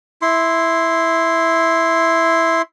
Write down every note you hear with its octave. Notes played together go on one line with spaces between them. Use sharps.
E4 C6